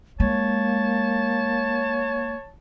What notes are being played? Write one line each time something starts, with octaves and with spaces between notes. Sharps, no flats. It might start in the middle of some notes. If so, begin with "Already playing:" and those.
G#3 A#3 C#5 A5